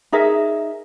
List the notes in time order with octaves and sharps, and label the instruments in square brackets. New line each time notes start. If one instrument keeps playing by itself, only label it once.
[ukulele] D#4 G#4 A#4 E5